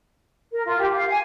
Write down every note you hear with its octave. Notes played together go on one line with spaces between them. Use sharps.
A#4
F4
G4
F5
G#5